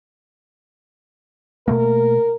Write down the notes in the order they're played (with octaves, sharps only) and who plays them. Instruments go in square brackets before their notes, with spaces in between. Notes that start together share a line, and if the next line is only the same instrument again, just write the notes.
[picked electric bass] B2 A3 A#3 [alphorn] A#4